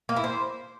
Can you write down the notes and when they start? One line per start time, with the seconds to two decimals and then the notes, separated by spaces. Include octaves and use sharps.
0.09 A#3
0.16 E4
0.24 C5